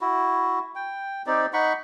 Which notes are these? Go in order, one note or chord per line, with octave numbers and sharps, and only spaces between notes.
E4 F#4
G5
C4 D#4 G4 D5
D#4 F#5 B5 C#6